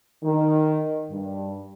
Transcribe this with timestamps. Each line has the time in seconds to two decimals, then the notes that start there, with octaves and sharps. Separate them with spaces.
0.23 D#3
1.10 G2